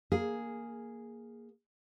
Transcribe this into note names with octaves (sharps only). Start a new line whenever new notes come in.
A#3 G#4